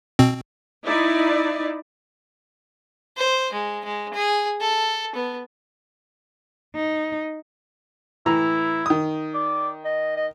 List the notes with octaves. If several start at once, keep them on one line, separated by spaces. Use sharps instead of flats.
B2 C4
D#4 E4 D5
C5
G#3
G#3
G#4
A4
B3
D#4
A2 E3 E4 A#5
D#3 D#6
D5
D#5
D#5